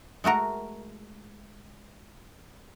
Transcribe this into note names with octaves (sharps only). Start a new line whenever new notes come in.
G#3 A3 F#4 A#4